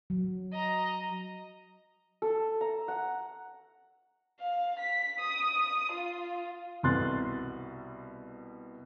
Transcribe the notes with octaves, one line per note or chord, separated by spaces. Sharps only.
F#3
D#5 A#5
A4
A#5
F#5
F5
B6
D#6
F4
C2 B2 C4 C6 F#6 A6